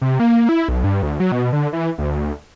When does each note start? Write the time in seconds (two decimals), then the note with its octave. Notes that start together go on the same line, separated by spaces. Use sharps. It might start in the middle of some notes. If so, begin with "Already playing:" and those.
0.01 C3
0.20 A#3
0.49 E4
0.69 B1
0.84 G2
1.03 D2
1.20 F#3
1.32 B2
1.53 D3
1.73 E3
1.98 D2